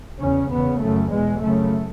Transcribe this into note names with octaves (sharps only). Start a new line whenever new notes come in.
E2 C#3 C#4
E2 C#3 B3
F#2 C#3 A3
E2 B2 G#3
F#2 C#3 A3